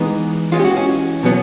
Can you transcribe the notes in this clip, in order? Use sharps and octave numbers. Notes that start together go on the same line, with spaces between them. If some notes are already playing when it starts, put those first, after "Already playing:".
Already playing: E3 G#3 B3 D#4
E3 G#3 C#4 F4
G4
F#4
C#4
B2 F#3 B3